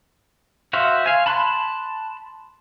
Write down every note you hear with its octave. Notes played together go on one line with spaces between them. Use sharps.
F#4 C5 E5 F5
F5 G#5
A5 B5 C6 F#6